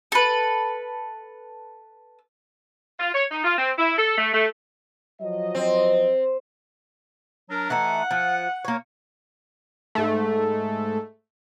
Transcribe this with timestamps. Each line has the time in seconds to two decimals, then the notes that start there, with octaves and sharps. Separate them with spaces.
0.12 A4 B4
2.99 F4
3.14 C#5
3.31 D#4
3.44 F4
3.58 C4
3.78 E4
3.98 A4
4.18 A3
4.33 A3
5.21 F3 F#3 D#5
5.55 C4
7.50 F#3 D4 A#4
7.70 E3 A3 D#4 F#5
8.11 F3
8.65 A#3 C#5
9.95 G#2 A3